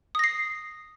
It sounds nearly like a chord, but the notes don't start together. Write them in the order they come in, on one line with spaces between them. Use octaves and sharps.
D#6 A#6 C7